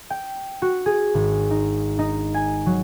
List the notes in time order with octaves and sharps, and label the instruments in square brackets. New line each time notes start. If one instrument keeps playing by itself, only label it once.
[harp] G5
F#4
G#4
G#1
D#4
D#4
G#5
F#3